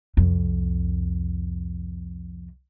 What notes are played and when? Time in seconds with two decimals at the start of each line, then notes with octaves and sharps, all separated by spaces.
0.17 C2 F2